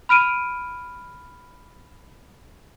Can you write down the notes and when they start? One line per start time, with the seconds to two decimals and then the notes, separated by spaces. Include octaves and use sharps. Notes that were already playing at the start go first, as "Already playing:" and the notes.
0.09 B5 F6 D7 D#7